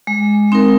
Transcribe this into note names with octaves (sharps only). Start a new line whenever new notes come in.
G#3
C4 D#4 A#4